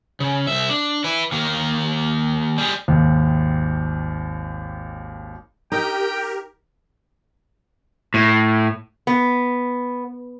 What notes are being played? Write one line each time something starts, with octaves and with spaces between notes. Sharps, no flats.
C#3
C2 E5
D4
E4 B4
D#3 A#3
G3 G#4
G#1 D#2
D#4 G4 A#4 G5
A2
B3